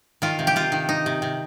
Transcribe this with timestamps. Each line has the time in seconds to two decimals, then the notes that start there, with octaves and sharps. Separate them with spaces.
0.22 D#3 F4
0.39 C3
0.47 G4
0.56 C3 F4
0.72 D#3
0.89 D#4
1.06 C3
1.22 C3